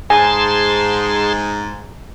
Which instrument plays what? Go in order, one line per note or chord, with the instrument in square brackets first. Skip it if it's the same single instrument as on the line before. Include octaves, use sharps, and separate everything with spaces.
[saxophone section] G#2 [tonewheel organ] G#4 A5 C6 [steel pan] G#5